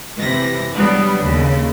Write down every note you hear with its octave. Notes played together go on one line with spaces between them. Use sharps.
C3 E3 A#6
F#3 G3 B3 D4
D#2 C#3